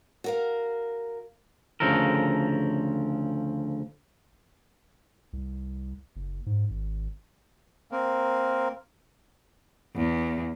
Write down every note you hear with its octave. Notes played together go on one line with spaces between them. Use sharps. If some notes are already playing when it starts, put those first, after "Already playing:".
F#4 A#4 F5
D2 G#2 C#3 F3 A4 A#4
C2
F#1
G#2
G#1
A#3 C4 A#4
E2